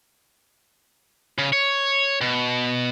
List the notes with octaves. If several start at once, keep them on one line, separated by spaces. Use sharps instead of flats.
C#3
C#5
B2